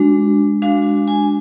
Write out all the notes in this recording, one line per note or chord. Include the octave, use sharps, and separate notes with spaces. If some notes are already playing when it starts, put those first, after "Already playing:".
Already playing: G#3 D4 F#4
G#3 D4 F#4 F5
G#5